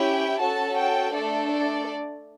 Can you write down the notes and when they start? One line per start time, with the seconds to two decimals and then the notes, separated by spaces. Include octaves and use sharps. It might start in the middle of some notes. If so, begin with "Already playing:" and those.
Already playing: C#4 E4 G4 G5
0.40 C#4 F#4 A4 A5
0.77 G5
1.13 A3 D4 A4 D5
1.50 D5